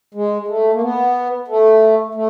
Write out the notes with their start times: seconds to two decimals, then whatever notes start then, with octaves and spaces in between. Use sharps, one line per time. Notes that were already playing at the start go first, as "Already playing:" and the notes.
0.14 G#3
0.48 A3
0.73 A#3
0.81 B3
1.48 A3
2.15 A3